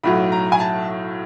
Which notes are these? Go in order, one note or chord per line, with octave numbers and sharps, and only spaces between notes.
B1 A2 F#3 B5
A#5
G#5
A5